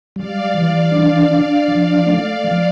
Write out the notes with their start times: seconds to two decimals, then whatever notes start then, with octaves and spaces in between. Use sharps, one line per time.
0.16 G3 D5 F5
0.54 E3
0.92 D4
1.30 D4
1.68 F3
2.06 A3
2.44 F3